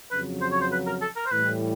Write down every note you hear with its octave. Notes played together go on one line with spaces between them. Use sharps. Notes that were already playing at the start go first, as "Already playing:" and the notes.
F2 C#3 F#3 B4
C5
C#5
C5
B4
A#4
A4
A#4
C5
A2 E3 G3 B4